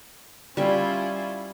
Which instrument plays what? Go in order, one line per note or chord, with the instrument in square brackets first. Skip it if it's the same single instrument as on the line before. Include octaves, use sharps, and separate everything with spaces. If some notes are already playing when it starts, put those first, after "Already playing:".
[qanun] G3 E5 [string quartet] C#4 E4 F4